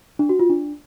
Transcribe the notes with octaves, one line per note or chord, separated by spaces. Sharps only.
D4
F#4
F4
D4